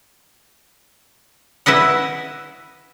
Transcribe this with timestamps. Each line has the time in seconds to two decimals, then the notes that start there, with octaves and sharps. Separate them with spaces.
1.66 E4 B4 D#5 F#5